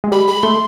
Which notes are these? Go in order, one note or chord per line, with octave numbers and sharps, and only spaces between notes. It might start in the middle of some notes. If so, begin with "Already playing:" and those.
G#3
G3 B5
G#3 B5
A3 C6